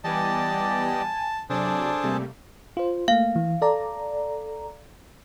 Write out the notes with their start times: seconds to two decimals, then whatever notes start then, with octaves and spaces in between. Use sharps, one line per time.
0.04 E3 G3 B3 G4 D5 D#5 G#5 A5
1.50 C3 F#3 D4 G#4 A4 C5 D5 A5
2.03 C3 G3 A3 A#3
2.77 F4 C5
3.08 A3 A#3 F5
3.36 E3
3.62 A4 D5 A#5